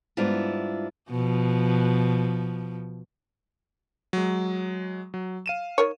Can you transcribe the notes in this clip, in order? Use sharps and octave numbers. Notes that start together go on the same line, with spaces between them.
G#2 G3 B3 D4 E4 F4
B2 F3
F#3 G#3
F#3
F5 D#7 E7
D#3 A#4 C#5